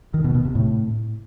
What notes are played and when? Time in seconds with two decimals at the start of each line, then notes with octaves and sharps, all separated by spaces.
0.14 D#3
0.24 B2
0.35 B2
0.45 C3
0.55 A2